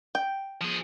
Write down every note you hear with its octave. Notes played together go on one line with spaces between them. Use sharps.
G5
F3 G#4